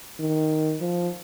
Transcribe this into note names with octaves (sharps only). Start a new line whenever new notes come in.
D#3
F3